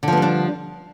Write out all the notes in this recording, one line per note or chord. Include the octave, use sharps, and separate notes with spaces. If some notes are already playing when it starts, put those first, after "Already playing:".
D3 F3 G3 B3 D4